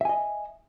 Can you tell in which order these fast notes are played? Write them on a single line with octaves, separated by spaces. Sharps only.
E5 G#5 D#5